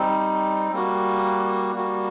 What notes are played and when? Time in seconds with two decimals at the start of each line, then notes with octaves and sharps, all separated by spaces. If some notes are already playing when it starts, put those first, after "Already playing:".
Already playing: G3 C4 D#4
0.72 G3 A#3 F#4
1.75 G3 A#3 F#4